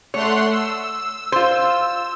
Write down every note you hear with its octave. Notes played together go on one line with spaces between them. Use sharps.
A3 C#5 F#5 C6
E6
F4 C5